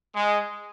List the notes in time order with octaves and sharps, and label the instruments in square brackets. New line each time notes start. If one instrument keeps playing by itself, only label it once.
[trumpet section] G#3